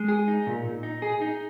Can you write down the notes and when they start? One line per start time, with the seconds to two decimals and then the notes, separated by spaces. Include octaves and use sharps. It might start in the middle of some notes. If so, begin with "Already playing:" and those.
Already playing: G#3
0.08 G#4
0.28 D#4
0.47 A#2
0.65 A#2
0.83 D#4
1.02 G#4
1.22 D#4